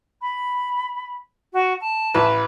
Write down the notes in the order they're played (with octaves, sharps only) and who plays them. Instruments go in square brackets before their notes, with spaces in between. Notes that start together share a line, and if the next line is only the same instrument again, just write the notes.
[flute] B5
F#4
A5
[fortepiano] A1 B4